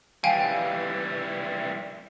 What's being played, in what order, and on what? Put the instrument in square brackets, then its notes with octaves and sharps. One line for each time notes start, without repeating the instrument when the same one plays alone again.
[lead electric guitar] E3 G3 [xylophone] F5 G5 G#5